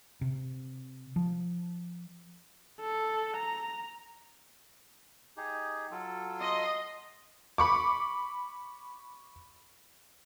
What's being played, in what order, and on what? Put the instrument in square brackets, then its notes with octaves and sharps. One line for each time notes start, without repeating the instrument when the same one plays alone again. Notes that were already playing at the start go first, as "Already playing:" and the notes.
[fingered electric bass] C3
F3
[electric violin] A4
A#5
[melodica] D#4 G4 G#4
F#3 F4 A4
[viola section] D#5 C6
[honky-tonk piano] B5 C#6 D6